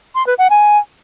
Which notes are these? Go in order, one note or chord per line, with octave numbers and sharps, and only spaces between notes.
C6
B4
F#5
G#5